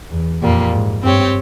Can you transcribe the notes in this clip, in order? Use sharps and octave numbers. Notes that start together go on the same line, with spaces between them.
E2
F2 A#2 G3 A#3
G#2
G2 C4 G4 C#5